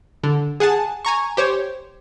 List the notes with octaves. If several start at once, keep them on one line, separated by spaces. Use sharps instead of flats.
D3
G#4 F#5 G#5 A5
G#5 A#5 C#6
G4 C5 C#5